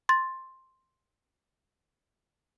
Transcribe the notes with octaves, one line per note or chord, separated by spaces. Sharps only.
C6 A6